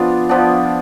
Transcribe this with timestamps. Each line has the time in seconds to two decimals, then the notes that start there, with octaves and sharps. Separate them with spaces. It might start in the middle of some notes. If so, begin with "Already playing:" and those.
Already playing: F3 B3 D4 F4
0.29 F3 B3 D4